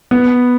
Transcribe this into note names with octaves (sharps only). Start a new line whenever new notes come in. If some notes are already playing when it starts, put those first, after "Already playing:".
B3